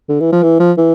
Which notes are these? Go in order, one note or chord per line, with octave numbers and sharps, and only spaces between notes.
D3
E3
F3
E3
F3
E3